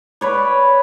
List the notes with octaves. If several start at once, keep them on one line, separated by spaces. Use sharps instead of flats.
B4 C#5 D5